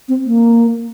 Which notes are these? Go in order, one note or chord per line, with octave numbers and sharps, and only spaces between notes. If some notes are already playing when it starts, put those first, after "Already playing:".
C4
A#3